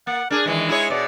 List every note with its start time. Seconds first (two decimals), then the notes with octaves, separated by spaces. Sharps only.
0.07 A#3 F#5
0.31 D4 G#4 A#4
0.46 D#3 E3 G#3
0.69 E4 G#4 C#5
0.90 B2 D5